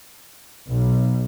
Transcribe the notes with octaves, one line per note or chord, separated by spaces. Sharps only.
B1